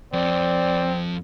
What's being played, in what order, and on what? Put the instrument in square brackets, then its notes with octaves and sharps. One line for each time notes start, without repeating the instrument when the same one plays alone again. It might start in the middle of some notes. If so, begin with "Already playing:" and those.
[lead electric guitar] F2 [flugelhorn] C4 [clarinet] D5